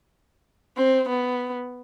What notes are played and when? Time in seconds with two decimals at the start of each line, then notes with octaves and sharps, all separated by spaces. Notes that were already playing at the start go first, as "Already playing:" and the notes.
0.77 C4
1.09 B3